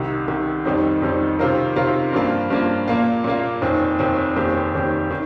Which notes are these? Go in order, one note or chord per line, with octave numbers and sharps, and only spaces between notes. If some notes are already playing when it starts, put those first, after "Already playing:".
Already playing: C2 C3 D#3
C2 C3 D#3
F2 D#3 G3 C4 D#4
F2 D#3 G3 C4 D#4
C3 D#3 C4 F4 A#4
C3 D#3 C4 F4 A#4
G2 F3 A#3 F4
G2 F3 A#3 F4
A#2 A#3 F4
A#2 A#3 F4
F1 D#2 D#3 C4
F1 D#2 D#3 C4
F1 D#2 D#3 C4 G4
F1 D#2 D#3 C4 G4
D#3